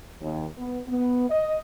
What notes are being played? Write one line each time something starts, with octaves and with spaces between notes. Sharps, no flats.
D#2
B3
B3
D#5